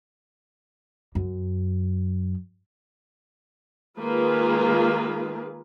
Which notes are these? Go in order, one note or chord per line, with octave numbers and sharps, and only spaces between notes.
F#2
D#3 G#3 A#3 F4 G#4 B4